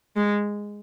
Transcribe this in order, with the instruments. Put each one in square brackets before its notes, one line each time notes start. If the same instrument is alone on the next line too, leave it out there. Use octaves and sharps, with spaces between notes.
[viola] G#3